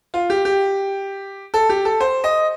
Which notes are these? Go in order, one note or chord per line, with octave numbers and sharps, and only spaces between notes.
F4
G4
G4
A4
G4
A4
C5
D#5